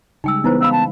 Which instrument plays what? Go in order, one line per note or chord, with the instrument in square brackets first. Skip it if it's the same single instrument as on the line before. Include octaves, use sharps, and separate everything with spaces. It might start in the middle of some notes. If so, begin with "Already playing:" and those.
[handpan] C#3 G3 G#3 [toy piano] D#4 G5 E6
[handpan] E3 [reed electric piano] B3 [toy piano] D#4 E4 C5 [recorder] B4
[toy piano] C#4 F5 B5 [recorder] E6
[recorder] A5